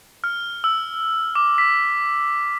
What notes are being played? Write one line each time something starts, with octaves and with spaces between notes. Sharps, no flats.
F6
E6
D6
B6